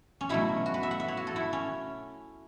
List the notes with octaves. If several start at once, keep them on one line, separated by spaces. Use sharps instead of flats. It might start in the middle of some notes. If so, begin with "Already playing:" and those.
C#4
B2 F#3 A3 E4
F#4
B4
E5
F#5
E5
C#5
F#4
A4
E4
C#4